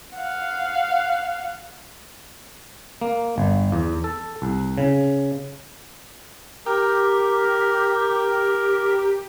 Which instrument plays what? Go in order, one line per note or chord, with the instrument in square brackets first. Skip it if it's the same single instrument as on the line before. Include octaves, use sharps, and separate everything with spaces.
[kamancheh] F5 F#5
[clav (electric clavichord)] A#3
G1
E2
A4
C2
C#3
[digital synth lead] G4 [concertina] A#4